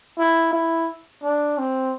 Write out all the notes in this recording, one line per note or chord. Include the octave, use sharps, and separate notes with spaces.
E4
E4
D4
C4